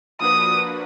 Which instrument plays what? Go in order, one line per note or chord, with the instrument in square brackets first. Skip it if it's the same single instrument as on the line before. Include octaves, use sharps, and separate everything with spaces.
[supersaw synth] F3 A#3 D4 F#4 B4 [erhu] D#6